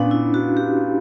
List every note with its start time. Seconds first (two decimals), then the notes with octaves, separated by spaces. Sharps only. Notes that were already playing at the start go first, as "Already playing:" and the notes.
Already playing: A#2 B3 C#4 D4
0.11 E4
0.34 F#4
0.57 G4